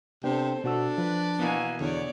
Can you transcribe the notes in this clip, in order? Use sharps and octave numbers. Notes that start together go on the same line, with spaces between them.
C3 B3 D4 A4 C5 G5
B2 A3 D4 F#4 E6
F3 B4
B2 E3 A#3 B3 G#5
E2 D3 C#5 D5